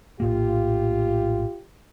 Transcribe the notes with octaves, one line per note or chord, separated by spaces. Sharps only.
A#1 A2 A#3 F4 G4